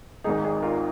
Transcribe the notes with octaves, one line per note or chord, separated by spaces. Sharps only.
G#1 G#2 D#3 D#4 G#4
D#4 G#4
F4 A#4